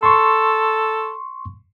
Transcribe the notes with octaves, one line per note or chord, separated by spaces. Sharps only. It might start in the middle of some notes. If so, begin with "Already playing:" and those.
A4 C6 C#6